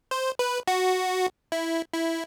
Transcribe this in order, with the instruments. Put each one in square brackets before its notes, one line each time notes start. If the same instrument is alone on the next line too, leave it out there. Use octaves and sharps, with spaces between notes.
[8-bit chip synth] C5
B4
F#4
E4
E4